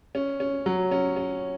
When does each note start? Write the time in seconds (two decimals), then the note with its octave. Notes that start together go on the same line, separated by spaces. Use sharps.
0.15 C#4
0.40 C#4
0.66 F#3
0.91 C#4
1.16 C#4